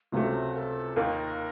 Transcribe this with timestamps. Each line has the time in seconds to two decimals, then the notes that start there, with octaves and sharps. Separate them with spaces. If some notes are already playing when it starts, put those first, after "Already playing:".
0.12 C#2 C3 F#3 A3 F#4
0.54 A#4
0.58 A4
0.96 D#2 D#3 A#3 D#4 C5
1.01 A#4